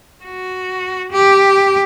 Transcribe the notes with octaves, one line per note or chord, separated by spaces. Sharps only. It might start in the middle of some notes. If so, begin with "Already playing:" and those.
F#4
G4